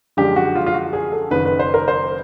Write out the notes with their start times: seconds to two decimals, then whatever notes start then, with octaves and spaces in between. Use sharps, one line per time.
0.17 F#2 D3 F3 G#3 G4
0.36 F#4
0.55 F4
0.66 F4
0.74 F#4
0.93 G#4
1.12 A4
1.31 F#1 F#2 D#3 B4
1.45 B4
1.59 C5
1.74 A#4
1.88 C5